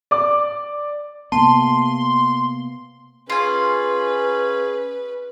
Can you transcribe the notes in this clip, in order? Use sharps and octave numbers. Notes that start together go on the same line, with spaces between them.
D5 D6
C3 A#3 B3 A5 C6
C#4 F4 G#4 B4 G#5